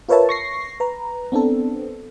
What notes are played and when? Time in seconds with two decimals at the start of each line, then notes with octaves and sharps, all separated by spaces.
0.09 F4 A#4 B4 C#5 E5 A5
0.29 C#6 A#6 C7
0.80 B4 A#5
1.32 B3 C4 D4 A4